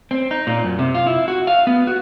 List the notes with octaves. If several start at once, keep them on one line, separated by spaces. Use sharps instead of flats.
C4
D#4
A#2
F#2
C3
F4
E4
F#4
F5
B3
F#4